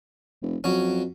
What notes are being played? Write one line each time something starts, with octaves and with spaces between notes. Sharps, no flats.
F1
F2 F#3 C#4